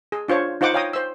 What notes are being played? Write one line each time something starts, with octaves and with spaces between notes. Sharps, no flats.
G#4
D4 F4 C5 C#5
D#4 F4 C5 F#5 D6
C#5 F5 G5 A#5 D#6
C5 E6